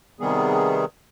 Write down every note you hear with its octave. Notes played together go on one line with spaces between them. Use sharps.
C3 D#3 G3 B3 G#4